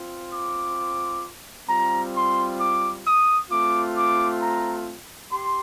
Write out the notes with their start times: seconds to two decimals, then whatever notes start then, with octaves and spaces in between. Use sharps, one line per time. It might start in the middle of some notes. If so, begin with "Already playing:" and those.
Already playing: C4 F4
0.32 D6
1.68 G3 C4 F4 A#5
2.14 C6
2.59 D6
3.05 D#6
3.50 A3 C4 F4 D6
3.96 D6
4.41 A#5
5.32 G4 C6